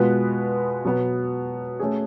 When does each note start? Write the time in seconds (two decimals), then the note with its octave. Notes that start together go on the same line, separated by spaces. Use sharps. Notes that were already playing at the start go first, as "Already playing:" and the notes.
Already playing: B2 G#3 B3 F4 B4
0.85 B2 F#3 B3
1.80 A3 C#4 G#4